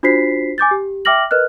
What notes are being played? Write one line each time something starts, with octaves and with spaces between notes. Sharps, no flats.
D4 F4 F#4 C5 B6 C7
G#5 D6 G6 A6
G4
E5 G5 D6 F6 A#6 F#7
A#4 B4 D#5 F6 F#6